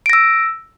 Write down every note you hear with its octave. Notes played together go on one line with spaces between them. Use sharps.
E6 A#6 D7